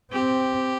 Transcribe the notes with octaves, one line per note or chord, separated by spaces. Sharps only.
C4 G4